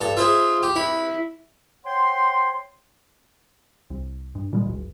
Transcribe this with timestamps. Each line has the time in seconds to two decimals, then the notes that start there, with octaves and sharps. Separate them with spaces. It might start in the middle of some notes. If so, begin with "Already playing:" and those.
0.01 G2 A4
0.17 F4 G#4 C5 E5
0.63 G4
0.76 E4 B4
1.85 C5 C#5 F#5 G5 C6
3.90 C2
4.35 G2
4.53 A#2 D3 G3 G#3
4.66 F#1 C#2